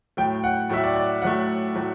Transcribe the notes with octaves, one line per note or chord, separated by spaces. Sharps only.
A2 F#3 A3 G5
F#5
A2 F#3 A3 E5
D5
D5
A2 F#3 A3 F#5
A2 F#3 A3